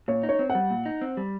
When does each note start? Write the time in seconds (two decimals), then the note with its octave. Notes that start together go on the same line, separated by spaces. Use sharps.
0.08 A#2 C#5
0.23 D#4
0.29 C#5
0.39 C4
0.50 F#5
0.55 G3
0.70 A#2
0.86 D#4
1.01 C4
1.17 G3